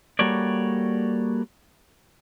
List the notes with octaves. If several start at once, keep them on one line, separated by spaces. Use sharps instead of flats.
G3 A#3 F#4 A4 C#5 D5